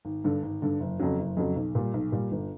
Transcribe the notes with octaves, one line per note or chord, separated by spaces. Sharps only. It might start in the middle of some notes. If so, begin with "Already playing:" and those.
G#1
G2 D3
G#1
G2 D3
F#1
F2 C#3 F#3
F#1
F2 C#3 F#3
B1
A#2 G3
B1
A#2 G3
G1